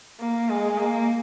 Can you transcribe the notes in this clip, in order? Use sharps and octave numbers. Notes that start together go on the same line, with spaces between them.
A#3
G#3
A#3